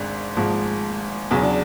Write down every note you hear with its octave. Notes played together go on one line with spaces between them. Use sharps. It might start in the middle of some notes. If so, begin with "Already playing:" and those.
Already playing: G#1 G#2 G#3 D4
G#1 G#2 F3 G#3
E2 C#3 F#3 C#4
D4